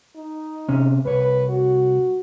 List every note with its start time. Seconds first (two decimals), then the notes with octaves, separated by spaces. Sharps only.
0.16 D#4
0.69 C3 C#4
1.05 C2 B4 C#5
1.50 F#4